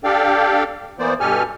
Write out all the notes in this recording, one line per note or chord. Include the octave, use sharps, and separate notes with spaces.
D4 G4 A4 D5 F5 G5
E3 A#3 B3 C5 D5
G2 B2 G4 A4 G#5 F6